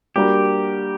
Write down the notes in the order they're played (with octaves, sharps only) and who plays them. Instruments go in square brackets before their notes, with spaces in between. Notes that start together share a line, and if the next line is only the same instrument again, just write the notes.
[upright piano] G3 A#3 D4 F#4 A#4 [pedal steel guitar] G4